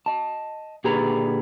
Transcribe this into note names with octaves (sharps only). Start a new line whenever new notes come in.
D#5 A5
A#2 D3 G4 G#4 B4 A#5